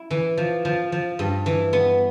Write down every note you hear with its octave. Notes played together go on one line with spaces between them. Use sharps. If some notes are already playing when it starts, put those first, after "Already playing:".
Already playing: E4
E3
F3
F3
F3
G2
E3
B3